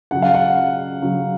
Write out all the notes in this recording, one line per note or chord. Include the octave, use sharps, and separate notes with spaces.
C#3 F#3 F#5
F5
F#5
C#3 F#3